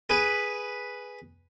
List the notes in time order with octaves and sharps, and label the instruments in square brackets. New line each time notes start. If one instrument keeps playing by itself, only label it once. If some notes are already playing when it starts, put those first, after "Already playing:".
[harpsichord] G#4 B4